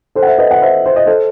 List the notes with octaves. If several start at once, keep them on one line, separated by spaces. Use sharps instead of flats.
A4 C5
F#5
C5 E5
B4 D#5
D#5 F#5
C5 E5
C5
D#5
A4 C5